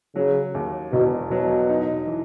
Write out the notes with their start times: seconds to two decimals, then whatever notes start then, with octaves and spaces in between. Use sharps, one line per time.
0.16 C#3 F#3
0.54 D#2
0.92 E1 B2
1.31 B2 F#3
1.69 D#4
2.07 E3